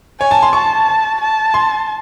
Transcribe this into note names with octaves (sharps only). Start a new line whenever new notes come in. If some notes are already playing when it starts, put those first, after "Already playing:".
C#5 G#5
A5
C6
A5 C#6
A5
C6